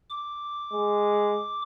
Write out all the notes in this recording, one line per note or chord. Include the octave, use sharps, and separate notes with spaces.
D6
G#3